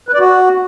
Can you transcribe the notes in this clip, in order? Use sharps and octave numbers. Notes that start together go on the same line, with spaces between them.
B4
D5
F#4